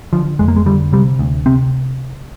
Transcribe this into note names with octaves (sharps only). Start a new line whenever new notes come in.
D3 F3
F2 G#3
A#3
G#3
D3 G3
C3 G3
D2
C3 C4